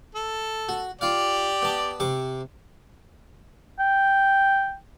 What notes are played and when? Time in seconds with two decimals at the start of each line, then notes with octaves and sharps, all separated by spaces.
0.15 A4
0.69 F#4
1.01 F4 G4 D5 F5
1.62 B3 A5
2.00 C3 C#6 D6
3.79 G5